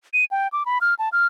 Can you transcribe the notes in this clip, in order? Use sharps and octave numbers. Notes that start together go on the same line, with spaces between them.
D#7
G5
D6
B5
F6
A5
F6